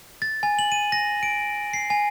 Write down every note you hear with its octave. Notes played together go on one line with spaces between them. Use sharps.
A6
G#5
F#7
D#7
A#6
D7
C7
G#5